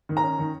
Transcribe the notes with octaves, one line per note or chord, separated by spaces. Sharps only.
D#3
A#5
C#4
D#3